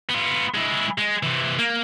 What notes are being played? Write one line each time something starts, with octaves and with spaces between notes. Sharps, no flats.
B3 F4
G#3 E4
G#3
C3 E3
A#3